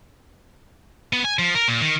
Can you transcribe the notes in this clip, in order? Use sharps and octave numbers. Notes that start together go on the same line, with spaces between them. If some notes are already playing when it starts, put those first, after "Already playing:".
B3
G#5
F3
A#4
A#2
D#3